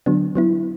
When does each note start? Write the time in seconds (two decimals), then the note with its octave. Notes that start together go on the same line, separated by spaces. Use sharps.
0.06 D3 F#3 B3 D4
0.35 F#3 B3 E4